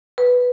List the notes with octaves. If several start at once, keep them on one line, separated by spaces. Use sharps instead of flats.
B4